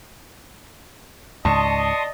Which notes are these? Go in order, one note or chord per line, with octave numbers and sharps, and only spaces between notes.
C#2 G#2 D5 D#5 A5 C6 C#6 D#6